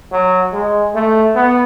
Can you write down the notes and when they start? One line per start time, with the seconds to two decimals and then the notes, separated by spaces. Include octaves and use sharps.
0.12 F#3
0.53 G#3
0.94 A3
1.35 B3